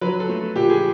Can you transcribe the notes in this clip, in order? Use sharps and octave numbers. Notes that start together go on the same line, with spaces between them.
F#3 B4
A4
A3
A#2 G4
G#4